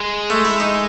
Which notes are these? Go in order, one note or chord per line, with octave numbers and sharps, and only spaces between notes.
G#3
A3
E4
D#4